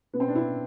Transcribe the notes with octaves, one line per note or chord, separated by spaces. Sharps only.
B3
C4
D4
E4